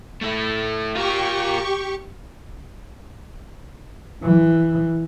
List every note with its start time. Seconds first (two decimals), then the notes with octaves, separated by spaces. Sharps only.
0.22 A3 E4
0.95 F4 G4 A#4 C#6
4.23 E3